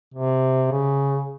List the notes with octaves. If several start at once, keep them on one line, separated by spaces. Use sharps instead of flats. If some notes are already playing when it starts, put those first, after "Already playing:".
C3
C#3